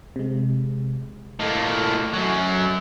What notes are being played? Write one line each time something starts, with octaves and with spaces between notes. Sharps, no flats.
C3 G#3
A2 A#3 A4 D#5
F#2 F#3